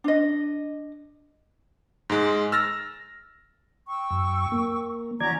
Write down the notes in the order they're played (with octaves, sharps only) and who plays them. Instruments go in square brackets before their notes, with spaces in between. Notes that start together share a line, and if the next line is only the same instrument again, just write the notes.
[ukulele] D4 D#5
[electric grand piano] G#2 G#3
E6 F6 A6 A#6
[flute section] G5 C#6 E6
[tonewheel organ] F#2
A#3
[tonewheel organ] E3 D5 G#6 [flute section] C#4 F#4 A#5